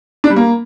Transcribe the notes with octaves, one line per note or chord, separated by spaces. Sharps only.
D4
G3
A#3